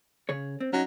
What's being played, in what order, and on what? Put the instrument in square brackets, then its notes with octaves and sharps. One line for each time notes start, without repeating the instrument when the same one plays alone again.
[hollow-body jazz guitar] C#3 G#4 C#5
C4
[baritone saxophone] F#3 [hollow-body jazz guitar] C#4 D#4